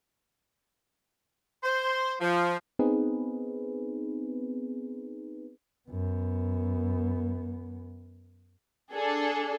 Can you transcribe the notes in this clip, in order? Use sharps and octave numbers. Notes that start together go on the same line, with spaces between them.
C5
F3
B3 C4 D#4 G#4 B4
F#2 B3
D4 G#4 A4